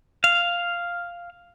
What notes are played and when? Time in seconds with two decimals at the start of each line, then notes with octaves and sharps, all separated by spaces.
0.24 F5